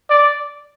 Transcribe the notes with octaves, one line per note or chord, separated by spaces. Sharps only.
D5